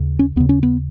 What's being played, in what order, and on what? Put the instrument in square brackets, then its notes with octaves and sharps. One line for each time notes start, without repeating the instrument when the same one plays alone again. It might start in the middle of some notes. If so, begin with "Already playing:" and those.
Already playing: [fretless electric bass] D#2 C#3
C#4
D#2 C#3 B3
C#4
B3